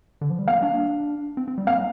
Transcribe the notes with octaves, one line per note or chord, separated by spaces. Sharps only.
D3
F3
G3
A#3 F5
D4
C4
C4
G3
A#3 F5